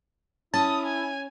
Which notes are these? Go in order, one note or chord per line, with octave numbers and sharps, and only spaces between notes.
C#4 E4 A5 D#6
G#5